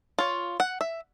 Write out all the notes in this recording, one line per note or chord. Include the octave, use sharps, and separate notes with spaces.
F4 C#5
F#5
E5